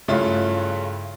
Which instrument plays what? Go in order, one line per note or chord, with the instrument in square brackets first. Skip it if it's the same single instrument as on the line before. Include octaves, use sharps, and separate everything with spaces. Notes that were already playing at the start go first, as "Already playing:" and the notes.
[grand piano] G2 C#3 A3 C#4 E4 F4